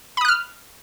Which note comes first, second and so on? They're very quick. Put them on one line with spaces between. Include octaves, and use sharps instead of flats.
B5 D#6 F#6 F6